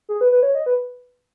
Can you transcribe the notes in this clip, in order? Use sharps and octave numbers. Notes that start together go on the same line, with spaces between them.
G#4
B4
B4
C#5
D#5
B4